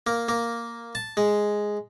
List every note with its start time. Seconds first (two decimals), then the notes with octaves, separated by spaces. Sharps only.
0.07 A#3
0.29 A#3
0.95 A5
1.17 G#3